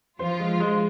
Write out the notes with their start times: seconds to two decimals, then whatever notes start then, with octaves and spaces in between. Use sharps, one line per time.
0.19 F3 F4 C5
0.40 G#3
0.60 G#3